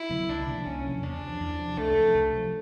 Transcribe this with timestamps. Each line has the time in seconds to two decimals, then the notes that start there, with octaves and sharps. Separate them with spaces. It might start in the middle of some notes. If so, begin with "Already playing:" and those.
Already playing: E4
0.09 D3 F#3 B3
0.28 C2 D4
0.47 C3 F3 A#3
0.66 C2 C#4
0.84 C3 F3 A#3
1.03 E2 D4
1.21 C3 F3
1.40 E2
1.58 C3 F3
1.77 C2 A3
1.95 C3 F3
2.14 C2
2.33 C3 F3